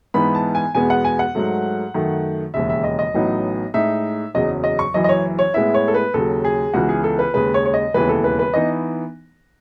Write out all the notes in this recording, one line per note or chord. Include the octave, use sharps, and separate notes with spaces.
G#2 E3 B3 D#4 B5
A5
G#5
E2 B2 G#3 B3 G#5
F#5
G#5
F#5
G#2 F#3 A3
F#2 D#3 A3
E1 D#2 C#3 E5
E5
D#5
D#5
A1 A2 F#3 B3 D#4
A2 G#3 D#4 E5
F#1 E2 C#3 F#3 D#5
D#5
C#6
F#1 F#2 E3 D#5
D#5
C#5
C#5
A2 G#3 B3 E4 E5
C#5
A4
B4
D#2 C#3 F#3 A4
G#4
C#2 C#3 E3 B3 F#4
G#4
A4
B4
D#2 C#3 G#3 B4
C#5
C#5
D#5
E1 D#2 C#3 E3 B3 B4
A4
B4
B4
E3 B3 D#4 D#5